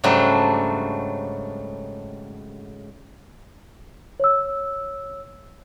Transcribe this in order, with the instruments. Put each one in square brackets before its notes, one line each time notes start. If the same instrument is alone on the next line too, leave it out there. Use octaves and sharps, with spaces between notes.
[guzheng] G#2 C#3 F#3 G3 A3 D4
[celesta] C#5 E6